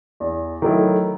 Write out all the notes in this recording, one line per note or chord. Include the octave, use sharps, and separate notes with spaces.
E2
D#3 F#3 A3 E4